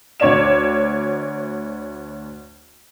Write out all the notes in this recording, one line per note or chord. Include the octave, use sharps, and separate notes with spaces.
D2 C#5 D5 E7